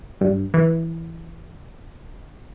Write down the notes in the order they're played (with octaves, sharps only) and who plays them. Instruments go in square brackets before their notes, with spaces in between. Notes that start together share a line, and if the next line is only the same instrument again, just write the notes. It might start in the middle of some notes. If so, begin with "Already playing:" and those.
[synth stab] G2
E3